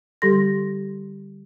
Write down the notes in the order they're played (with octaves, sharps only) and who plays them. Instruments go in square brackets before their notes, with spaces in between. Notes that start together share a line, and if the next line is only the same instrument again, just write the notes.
[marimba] D3 G3 G4 A4 C6 A#6